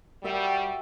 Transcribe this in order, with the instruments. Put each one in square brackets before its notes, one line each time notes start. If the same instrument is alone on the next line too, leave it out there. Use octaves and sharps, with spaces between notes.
[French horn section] G3 [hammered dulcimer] F#4 E5 G5